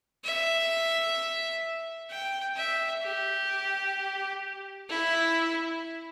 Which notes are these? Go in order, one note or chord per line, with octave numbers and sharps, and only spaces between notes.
E5
G5
E5
G4
E4